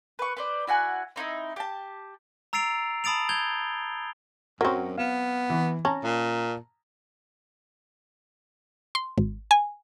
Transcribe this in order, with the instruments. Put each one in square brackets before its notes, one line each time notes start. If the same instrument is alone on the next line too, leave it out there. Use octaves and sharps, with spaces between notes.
[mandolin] B4 C#6
B4 C5 D5
E4 F#4 F#5 G#5
C4 D#4 E4 D#5
G4 A5
[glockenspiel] A#5 E6 A6 C7 D7 F7
A5 B5 D#6 A6 D7 F7
G6 G#6 F7 G7
[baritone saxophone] F#2 [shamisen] F#3 C4 [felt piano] A#4 C#6
[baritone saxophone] B3 [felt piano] F5
[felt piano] E3
[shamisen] C#4 [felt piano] A5 A#5
[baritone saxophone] A#2
[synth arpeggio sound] C6
G#1
G#5